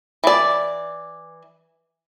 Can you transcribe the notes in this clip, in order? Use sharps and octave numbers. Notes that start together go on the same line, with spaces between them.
E3 D5